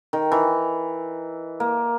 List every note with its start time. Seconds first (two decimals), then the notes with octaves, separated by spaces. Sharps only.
0.13 D#3
0.32 E3
1.60 A#3